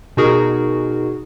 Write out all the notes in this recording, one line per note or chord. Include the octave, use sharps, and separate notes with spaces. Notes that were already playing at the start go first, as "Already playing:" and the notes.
B2 D#4 F#4 G#4 A#4